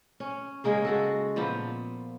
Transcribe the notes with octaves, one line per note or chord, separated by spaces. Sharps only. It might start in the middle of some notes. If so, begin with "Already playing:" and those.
C#4
C#3 G#3 A#3 G#4
G#3 F#4 A4
A#2 F3 B3